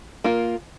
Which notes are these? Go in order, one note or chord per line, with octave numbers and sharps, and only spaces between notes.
A#3 F4 A#4